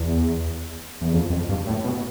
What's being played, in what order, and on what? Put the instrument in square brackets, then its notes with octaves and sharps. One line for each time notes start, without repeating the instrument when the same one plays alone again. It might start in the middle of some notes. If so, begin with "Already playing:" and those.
Already playing: [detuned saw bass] E2
E2
F2
F2
G2
A2
B2